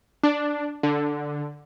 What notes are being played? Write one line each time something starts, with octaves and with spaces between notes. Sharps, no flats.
D4
D3